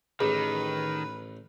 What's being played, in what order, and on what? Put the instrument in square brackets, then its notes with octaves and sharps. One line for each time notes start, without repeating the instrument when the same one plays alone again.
[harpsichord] A1 [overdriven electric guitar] D#3 [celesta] G#4 [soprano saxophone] B4